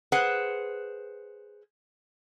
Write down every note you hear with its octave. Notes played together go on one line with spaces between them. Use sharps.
G#4 B4 C5 F#5